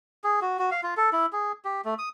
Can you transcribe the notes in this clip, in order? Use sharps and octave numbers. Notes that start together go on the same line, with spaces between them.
G#4
F#4
F#4
F5
F4
A4
E4
G#4
G4
A3
D#6